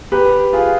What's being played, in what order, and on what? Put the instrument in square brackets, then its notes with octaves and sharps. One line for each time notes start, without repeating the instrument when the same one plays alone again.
[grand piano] G4 B4
F4 G#4